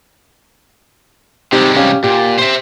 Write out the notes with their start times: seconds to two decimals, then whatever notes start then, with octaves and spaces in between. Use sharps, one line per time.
1.52 C3 G3 G#3 C4 D#4 G4
1.76 C#4 G4 F5
2.04 A#2 G4
2.38 C5 E5